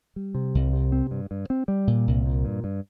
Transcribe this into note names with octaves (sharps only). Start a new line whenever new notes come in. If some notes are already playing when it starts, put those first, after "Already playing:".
G3
C3
C2
C3
C4
G2
G2
C4
G3
A#2
C2
A#2
G2
G2